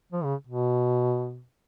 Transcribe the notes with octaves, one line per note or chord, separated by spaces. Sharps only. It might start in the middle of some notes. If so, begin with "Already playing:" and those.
F3
C#3
B2